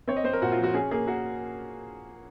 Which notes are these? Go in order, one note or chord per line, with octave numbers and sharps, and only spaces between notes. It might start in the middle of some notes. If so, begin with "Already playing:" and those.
C4 C#5
D#5
C4 C5
A#4
A#2 F#4
F4
F3
F#4
C#4 G#4
A#3 G#4
A#3 F#4